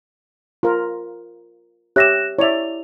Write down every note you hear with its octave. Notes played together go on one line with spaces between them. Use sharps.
F4 A#4
G4 C#5 E5 F#6 A#6 E7
E4 C#5 D5 E5 F7